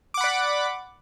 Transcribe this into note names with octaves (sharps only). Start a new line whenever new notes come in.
D5 F#5 B5 D6